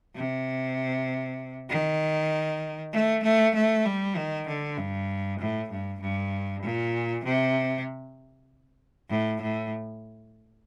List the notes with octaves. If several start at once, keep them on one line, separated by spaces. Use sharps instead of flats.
C3
D#3
A3
A3
A3
G3
D#3
D3
G2
A2
G2
G2
A#2
C3
A2
A2